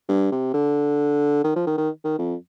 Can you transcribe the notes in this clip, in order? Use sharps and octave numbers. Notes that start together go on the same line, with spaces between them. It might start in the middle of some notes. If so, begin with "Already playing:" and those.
G2
C3
D3
D#3
F3
D#3
D#3
D#3
F2